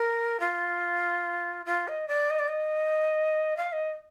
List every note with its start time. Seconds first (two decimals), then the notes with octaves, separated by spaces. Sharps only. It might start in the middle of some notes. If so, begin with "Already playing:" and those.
Already playing: A#4
0.40 F4
1.66 F4
1.88 D#5
2.08 D5
2.30 D#5
2.39 D5
2.48 D#5
3.57 F5
3.72 D#5